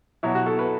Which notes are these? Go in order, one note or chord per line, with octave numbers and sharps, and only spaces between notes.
B2 F#3 E4
F#4
A4
B4